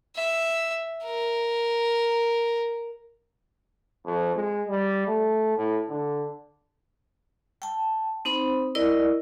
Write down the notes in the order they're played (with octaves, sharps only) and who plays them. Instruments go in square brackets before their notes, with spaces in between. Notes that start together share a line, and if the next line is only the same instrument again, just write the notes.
[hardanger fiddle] E5
A#4
[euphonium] F2
G#3
G3
A3
A2
D3
[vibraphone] G5 A5
C4 D#4 C5 B5
E4 A#4 D5 D#5